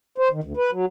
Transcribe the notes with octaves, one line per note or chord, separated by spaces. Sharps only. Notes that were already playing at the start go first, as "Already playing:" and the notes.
C5
D#3
D2
B4
F#3